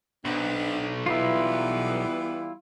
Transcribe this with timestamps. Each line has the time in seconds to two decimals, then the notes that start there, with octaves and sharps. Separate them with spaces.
0.25 B1 B3 C4 D4
1.06 E3 G3 B3 E4 F4